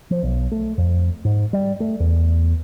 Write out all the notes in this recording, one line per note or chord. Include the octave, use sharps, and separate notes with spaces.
F3
B1
A3
F2
G#2
G3
A3
E2